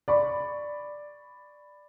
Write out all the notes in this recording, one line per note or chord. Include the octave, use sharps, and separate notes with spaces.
D5 B5 C#6